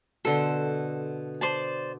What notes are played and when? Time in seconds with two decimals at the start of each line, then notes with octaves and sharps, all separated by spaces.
0.25 B2 D3 A4 C6
1.41 C5 D5 A5